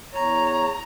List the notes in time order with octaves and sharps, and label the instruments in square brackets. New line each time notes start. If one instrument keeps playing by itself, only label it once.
[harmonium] E2 C#5 [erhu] A#5